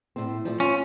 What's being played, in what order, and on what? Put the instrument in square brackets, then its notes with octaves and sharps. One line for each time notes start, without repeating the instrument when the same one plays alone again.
[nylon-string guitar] A2 C4
F3 G3 A3
[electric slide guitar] C#4 [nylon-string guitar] F4